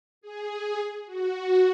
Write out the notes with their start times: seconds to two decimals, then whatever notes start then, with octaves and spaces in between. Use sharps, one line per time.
0.21 G#4
1.06 F#4